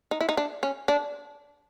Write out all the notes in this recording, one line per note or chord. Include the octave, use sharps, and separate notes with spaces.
D#4
E4
D#4
D4
C#4
D4